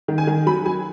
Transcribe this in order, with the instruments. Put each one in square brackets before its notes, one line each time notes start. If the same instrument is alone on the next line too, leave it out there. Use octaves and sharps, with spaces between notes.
[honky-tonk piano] D#3
G#5
D#3
F#3 B5
F#3 G#5